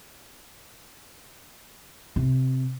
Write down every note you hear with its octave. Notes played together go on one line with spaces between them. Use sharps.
C3